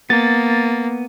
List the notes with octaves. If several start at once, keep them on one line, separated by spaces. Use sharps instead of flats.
A#3 B3 A6